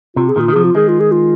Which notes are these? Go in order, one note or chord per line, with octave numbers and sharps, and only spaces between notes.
C3 F4
G#4
A#2 D#3 F4
D#3
C3 F3 G#4
F4
D#3 G#3 G#4
F4
G#4
F4